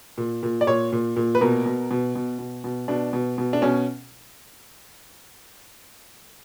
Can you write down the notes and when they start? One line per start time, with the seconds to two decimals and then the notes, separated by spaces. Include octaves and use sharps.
0.18 A#2
0.43 A#2
0.61 D5
0.67 A#2 C#5
0.92 A#2
1.16 A#2
1.35 B4
1.41 B2 A#4
1.66 B2
1.91 B2
2.15 B2
2.39 B2
2.64 B2
2.88 B2 D4
3.13 B2
3.38 B2
3.53 D4
3.62 B2 C#4